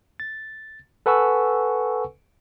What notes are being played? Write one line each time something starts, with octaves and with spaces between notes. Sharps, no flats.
A6
A4 B4 F#5 G#5 C#6 E6